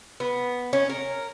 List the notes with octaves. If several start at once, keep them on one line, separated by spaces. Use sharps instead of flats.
B3
C#4
A#4